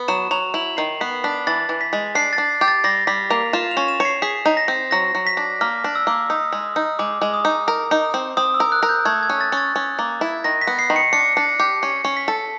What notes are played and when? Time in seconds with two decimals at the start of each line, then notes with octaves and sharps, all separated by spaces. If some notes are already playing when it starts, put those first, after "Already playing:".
Already playing: B3
0.08 F#3 E7
0.31 F#3 F7
0.54 E4 F#7
0.77 D#3 C7
1.01 B3 B6
1.24 D4 B6
1.47 E3 A6
1.69 E3
1.81 B6
1.93 G#3
2.15 D4 C7
2.33 A6
2.38 D4
2.61 G4
2.68 A6
2.84 G3 A#6
3.07 G3 B6
3.30 A#3 F7
3.53 F4 E7
3.71 F7
3.77 C#4
3.88 E7
4.00 C#5
4.05 C7
4.22 G#4 B6
4.45 D#4
4.57 A#6
4.68 C4
4.91 F#3 A#6
5.15 F#3
5.27 B6
5.37 D4
5.61 A#3 F6
5.84 D4
5.95 E6
6.07 A#3
6.30 D#4 D#6
6.52 G#3
6.76 D#4
6.99 G#3 D6
7.21 G#3
7.34 D#6
7.45 D#4
7.68 A#4
7.91 D#4
8.14 C4
8.37 C4 D#6
8.54 E6
8.60 A#4
8.72 F#6
8.83 A#4
8.89 G6
9.05 A3 G#6
9.23 G#6
9.30 C#4
9.41 A6
9.52 C#4 A6
9.76 C#4
9.99 A#3
10.21 E4
10.44 D#3 A#6
10.61 B6
10.67 B3
10.79 C7
10.90 D#3
10.96 C#7
11.13 D4 C#7
11.37 D4
11.60 G4
11.82 C#4 C#7
12.05 C#4
12.17 B6
12.28 A4